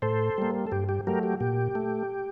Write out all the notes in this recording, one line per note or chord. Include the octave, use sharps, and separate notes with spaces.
A2 A4 C5
G3 A#3
A4
G2 G4
G4
F#3 A3 G4 A#4
G4
A#2 G4
A3